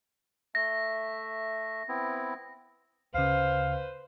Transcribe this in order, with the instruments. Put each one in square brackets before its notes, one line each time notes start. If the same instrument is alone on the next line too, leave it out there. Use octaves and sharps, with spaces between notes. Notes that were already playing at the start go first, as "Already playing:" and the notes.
[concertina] A3 E5 [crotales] A#6
[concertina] B3 C4 E4
[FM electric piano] D2 C#3 [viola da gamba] B4 C5 [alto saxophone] F5